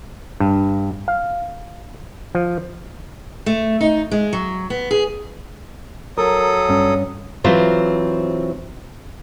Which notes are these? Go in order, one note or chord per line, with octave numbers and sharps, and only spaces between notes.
G2
F5
F3
A3
D#4
G#3
F#3
B3
G#4
F#3 A4 A#4 D#6
G2 C#4
E3 F#3 C4 F4 G4 C5